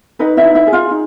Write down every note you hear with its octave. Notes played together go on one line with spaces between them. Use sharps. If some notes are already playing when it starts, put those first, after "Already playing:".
D#4 B4 D#5
E4 E5
D#4
E4 E5
G#4
F4 F5
D#4